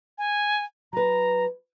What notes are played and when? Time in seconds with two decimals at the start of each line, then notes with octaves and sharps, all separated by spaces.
0.18 G#5
0.93 F#3 B4 A#5